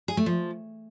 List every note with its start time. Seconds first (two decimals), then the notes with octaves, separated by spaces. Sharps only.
0.08 G#4
0.17 A3
0.26 F3